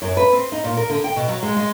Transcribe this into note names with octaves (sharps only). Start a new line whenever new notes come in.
F#2
B4
C4
D#4
A#2
A#4
D3
G5
B2
F#3
G#3
G#3